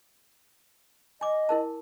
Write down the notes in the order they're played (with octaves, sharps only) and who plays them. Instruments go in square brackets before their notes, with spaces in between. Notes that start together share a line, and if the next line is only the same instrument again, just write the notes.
[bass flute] D#5 [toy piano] G#5 D6
[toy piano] E4 A#4 A5